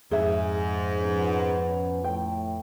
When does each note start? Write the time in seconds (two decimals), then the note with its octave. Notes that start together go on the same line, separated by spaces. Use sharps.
0.11 F2 G#2 G#4 E5
1.01 F3 B3 C#4
2.04 A2 G5